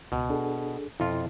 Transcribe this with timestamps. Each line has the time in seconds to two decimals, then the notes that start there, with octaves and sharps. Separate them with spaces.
0.12 C#2 B2
0.30 D4 G#4 A4
1.00 F2 B2 E4 F4